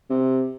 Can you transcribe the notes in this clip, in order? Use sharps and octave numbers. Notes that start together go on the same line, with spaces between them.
C3